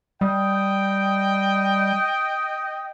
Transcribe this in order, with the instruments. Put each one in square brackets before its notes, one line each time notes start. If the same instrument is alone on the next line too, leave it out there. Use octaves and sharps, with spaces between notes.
[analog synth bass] G3 [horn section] D#5 G5